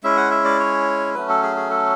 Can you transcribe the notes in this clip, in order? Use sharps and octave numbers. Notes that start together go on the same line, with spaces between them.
G#3 C#4 E4 E5
F#5
E5
D5
C#5
F#3 A3 C#4 B4
A4
G#4
G#4
A4